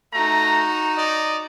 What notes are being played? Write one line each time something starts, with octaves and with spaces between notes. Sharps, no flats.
A3 D#4 F#4 A#5
D5 D#5